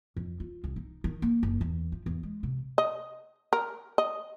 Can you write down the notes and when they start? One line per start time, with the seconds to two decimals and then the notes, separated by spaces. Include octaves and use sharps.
0.17 F2
0.40 F4
0.64 C2
0.76 D#4
1.04 D#3
1.22 A#3
1.43 F#1
1.61 E2
1.92 F3
2.06 E2
2.23 G#3
2.43 C3
2.78 D#5
3.53 A#4
3.98 D#5